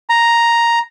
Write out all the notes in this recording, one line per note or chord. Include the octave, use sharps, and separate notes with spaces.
A#5